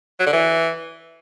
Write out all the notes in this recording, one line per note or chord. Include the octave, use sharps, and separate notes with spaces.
F#3
D3
E3